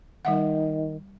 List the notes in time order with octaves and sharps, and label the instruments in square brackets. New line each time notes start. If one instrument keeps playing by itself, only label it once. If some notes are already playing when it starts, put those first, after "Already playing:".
[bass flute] D#3 [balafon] G3 E5 F#5